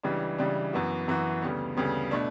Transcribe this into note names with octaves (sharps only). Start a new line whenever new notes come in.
C#2 C#3 E3 G3 D4
C#2 C#3 E3 G3 D4
F#2 E3 B3 F#4
F#2 E3 B3 F#4
D2 C#3 G3 B3
D2 C#3 G3 B3
B2 A3 D4